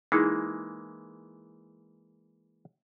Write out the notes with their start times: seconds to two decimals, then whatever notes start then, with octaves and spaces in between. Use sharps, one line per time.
0.12 E3 G#3 A#3 D#4 E4 G#4